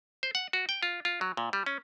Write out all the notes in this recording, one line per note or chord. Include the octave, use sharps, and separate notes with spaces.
C5
F#5
F#4
G5
F4
F4
F#3
A#2
G3
C#4